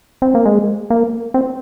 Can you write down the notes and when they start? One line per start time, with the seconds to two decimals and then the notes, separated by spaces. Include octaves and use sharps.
0.22 C4
0.35 A#3
0.46 G#3
0.90 A#3
1.34 C4